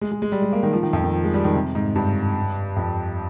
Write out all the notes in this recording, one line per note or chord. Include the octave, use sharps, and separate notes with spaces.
G#3
G#3
G#3
G3
G#3
A#3
D#3
F3
D#3
F2
D#3
F3
G#3
G3
D#3
C3
G#2
G2
F2